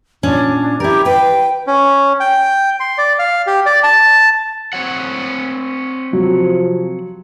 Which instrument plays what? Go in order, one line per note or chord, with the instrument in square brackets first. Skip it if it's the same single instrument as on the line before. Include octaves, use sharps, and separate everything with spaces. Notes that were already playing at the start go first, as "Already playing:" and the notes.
[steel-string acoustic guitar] A#2 C#4 [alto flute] D4
[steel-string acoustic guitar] E4 A#4 [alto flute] G4
[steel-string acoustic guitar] B4 [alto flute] G5
[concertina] C#4
G5
C6
D5
F5
G4
D5
A5
[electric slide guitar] C4 C#5 F#5
[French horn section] C3 F3 [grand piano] F#3